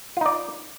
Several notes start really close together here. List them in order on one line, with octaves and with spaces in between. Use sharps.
F4 D#4 D5